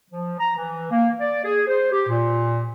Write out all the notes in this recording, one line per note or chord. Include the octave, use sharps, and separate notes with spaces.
F3
A#5
E3
A#3
D5
G#4
C5
G4
A#2